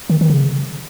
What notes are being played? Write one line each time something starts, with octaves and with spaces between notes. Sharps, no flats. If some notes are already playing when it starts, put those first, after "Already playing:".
D#3
D#3
C#3